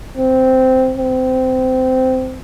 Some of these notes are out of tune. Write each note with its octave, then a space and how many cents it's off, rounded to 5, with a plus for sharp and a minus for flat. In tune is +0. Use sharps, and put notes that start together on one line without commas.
C4 -10
C4 -20